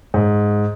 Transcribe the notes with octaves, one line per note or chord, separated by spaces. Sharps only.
G#2